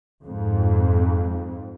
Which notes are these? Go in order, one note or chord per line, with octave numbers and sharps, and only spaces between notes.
F2 G#2